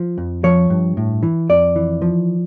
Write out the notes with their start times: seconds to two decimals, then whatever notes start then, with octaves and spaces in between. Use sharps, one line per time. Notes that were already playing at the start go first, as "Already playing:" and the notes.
Already playing: F3
0.18 F2
0.44 F3 C#5
0.70 G2
0.97 A2
1.23 E3
1.49 F2 D5
1.76 E3
2.02 F3